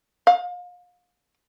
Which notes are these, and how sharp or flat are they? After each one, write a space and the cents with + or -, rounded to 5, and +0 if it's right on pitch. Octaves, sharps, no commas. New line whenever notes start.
F5 +35